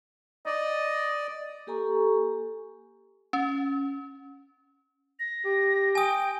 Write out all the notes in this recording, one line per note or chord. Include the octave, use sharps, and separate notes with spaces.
D5 D#5
A#3 G4 A4 G#5 A#5 C#6
C#4
A#6
G4
G5 G#5 D#6